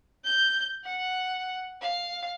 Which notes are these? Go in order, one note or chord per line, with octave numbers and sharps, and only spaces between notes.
G6
F#5
F5